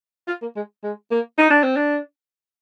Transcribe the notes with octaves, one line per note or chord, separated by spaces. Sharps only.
F4
A#3
G#3
G#3
A#3
D#4
D4
C4
D4